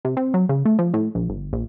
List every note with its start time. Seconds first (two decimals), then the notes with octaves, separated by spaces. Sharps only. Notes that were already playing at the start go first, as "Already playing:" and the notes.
0.05 C3
0.17 C4
0.34 F#3
0.49 C#3
0.65 A3
0.79 F3
0.94 A2
1.15 A#1
1.29 G1
1.53 A#1